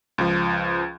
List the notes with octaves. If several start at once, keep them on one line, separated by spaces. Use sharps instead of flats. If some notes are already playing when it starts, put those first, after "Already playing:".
C#2 F3